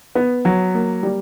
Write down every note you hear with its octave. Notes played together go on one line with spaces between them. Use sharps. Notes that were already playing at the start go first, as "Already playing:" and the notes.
B3
F#3
A#3
G3